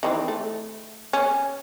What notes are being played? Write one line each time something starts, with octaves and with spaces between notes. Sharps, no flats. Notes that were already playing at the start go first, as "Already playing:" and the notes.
D#3 E3 C4
A3
C#4